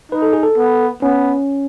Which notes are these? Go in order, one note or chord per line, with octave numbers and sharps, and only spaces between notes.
D#4 B4
A4
G#4
A4
B3
B3 C#4